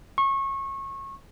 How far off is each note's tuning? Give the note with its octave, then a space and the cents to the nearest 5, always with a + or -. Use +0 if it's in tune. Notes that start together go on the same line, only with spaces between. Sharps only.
C#6 -25